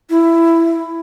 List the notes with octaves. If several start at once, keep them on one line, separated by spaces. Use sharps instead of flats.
E4